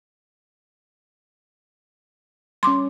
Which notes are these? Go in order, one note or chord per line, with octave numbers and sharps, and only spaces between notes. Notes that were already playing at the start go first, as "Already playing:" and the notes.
G3 C#4 C6 D6